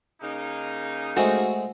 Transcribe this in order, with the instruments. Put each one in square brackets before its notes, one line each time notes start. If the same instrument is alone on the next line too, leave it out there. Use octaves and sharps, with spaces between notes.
[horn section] C#3 A#3 D#4
[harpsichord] G#3 A3 C4 [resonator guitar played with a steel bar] F#4